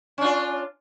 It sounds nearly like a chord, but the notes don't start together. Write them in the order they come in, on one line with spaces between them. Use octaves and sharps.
C#4 D4 F4